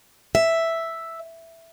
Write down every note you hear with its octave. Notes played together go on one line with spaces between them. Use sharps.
E5